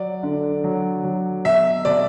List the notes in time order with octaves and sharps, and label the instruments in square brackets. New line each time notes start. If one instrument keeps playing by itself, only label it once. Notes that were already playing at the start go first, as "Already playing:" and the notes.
Already playing: [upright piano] F#3 D5
D3
F#3
F#3
B2 E5
B2 D5